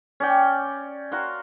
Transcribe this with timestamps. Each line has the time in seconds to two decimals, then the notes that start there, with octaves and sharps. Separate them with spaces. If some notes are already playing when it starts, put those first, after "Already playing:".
0.20 C#4 D5 G5
1.12 F#4 A#4 F5 C6